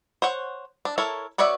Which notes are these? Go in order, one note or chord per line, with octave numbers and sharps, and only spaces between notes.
C5 C#5 F#5
D4
E4 A4 A#4 C#5
B3 F#4 C#5 D5 E5